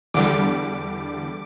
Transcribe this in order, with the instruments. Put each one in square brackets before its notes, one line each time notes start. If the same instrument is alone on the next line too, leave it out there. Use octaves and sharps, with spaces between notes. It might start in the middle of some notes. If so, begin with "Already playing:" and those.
[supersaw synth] E2 D3 G3 D6